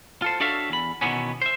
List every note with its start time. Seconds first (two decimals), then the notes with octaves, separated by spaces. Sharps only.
0.22 F4 A4 C5
0.40 D4 F#4 A4 C#5 E5 F5
0.70 E2 B5
1.01 B2 D#3 E3 B3 C#4
1.42 C5 E5